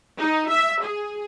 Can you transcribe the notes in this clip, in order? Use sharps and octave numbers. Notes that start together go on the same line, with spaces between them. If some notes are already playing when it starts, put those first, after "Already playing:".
D#4
E5
G#4